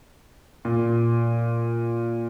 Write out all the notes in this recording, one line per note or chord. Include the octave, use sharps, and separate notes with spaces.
A#2